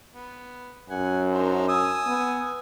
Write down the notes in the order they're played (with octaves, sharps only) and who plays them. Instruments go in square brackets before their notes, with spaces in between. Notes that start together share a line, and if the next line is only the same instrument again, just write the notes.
[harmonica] B3
[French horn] F#2 [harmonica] F#5 G#5
[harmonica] D4 D#4 C5
G#5 D#6 E6
[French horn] B3